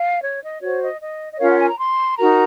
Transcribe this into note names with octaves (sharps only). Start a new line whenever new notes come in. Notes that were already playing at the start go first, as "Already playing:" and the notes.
Already playing: F5
C#5
D#5
F#4 C5 C#5
D#5
D#5
D#5
C#4 F4 A#4 C#5 F5
F#5
G#5
A#5
C6
D#4 F#4 A#4 A#5